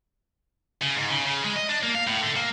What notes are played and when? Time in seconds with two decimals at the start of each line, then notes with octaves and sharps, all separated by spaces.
0.82 C#3
0.96 G#2
1.10 C#3
1.25 C#3
1.44 G#3
1.56 D#5
1.69 D4
1.83 A#3
1.95 F5
2.07 A2
2.22 D3
2.36 A#3